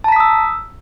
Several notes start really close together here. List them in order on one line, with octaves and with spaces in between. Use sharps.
A5 A#5 B6 D#6 E6